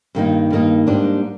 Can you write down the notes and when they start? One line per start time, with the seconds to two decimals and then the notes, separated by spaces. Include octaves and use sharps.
0.15 G2 D#3 A#3 D#4
0.50 G2 D#3 A#3 D#4
0.87 G#2 G3 A#3 D4